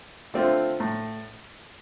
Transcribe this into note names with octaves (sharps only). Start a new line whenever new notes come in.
D3 A3 C4 F4
A2